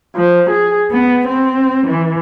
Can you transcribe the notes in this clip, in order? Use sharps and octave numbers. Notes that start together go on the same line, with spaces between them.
F3
G#4
B3
C4
E3